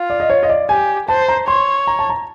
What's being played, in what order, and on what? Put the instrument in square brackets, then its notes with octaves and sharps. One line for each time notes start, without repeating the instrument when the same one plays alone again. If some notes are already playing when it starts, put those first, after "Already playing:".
Already playing: [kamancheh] F4
[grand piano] D5
D#5
C#5
D#5
D5
[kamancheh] G4 [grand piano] G#5
[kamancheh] C5 [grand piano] A5
[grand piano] A#5
[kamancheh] C#5 [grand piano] C6
[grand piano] A#5
A5
A#5